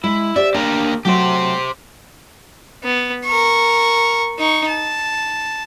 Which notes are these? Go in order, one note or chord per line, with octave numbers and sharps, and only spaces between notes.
G#3 E4
G4 C5 D5 E5
A#3 D4 G4 A#4
F#3 A3 F#4 G4 C5
B3
A#4 C#6
D#4 C#6
A5